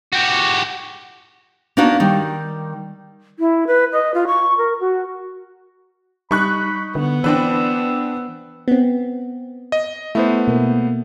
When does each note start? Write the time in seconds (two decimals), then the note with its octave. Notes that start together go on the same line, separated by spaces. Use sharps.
0.13 F#4 G4
1.77 A#3 B3 D4 D#4 F#4
2.00 D#3 G3
3.39 E4
3.67 B4
3.92 D#5
4.14 F4
4.27 C#6
4.58 A#4
4.80 F#4
6.31 G3 D#4 B5 C#6 F#6
6.95 D3 B3
7.24 E3 C4 D4 B4 E6
8.68 B3 C4
9.72 D#5
10.15 A3 B3 E4 C5
10.47 B2 A#3